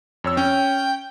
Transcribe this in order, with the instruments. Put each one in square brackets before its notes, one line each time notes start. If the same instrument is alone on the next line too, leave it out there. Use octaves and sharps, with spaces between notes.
[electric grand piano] F2 C#5 E6
[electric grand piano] C#4 [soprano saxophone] G5